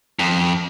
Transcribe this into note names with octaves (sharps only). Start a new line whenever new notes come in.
F2